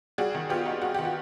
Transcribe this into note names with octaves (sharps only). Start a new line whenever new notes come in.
G3 F#4 G#4
D#3
B3 F4 G4
D#4 F#4
G3 F#4
D#3 G4
F#4